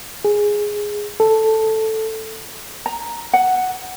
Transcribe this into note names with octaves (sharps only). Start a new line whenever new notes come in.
G#4
A4
A#5
F#5